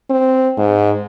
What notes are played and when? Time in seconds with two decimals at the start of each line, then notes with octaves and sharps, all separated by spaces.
0.10 C4
0.58 G#2